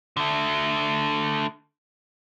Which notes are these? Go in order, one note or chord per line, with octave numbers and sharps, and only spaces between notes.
D3 A3